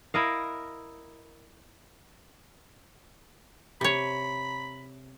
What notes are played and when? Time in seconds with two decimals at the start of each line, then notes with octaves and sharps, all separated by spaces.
0.14 E4 A#4 D#5 F5
3.81 C3 C#5 B5